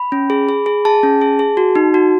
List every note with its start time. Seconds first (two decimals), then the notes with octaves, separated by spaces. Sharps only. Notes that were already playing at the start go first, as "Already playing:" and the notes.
Already playing: B5
0.12 C#4
0.30 G#4
0.49 G#4
0.66 G#4
0.85 G#4 A5
1.03 C#4
1.21 G#4
1.39 G#4
1.57 F#4
1.75 D#4
1.94 F#4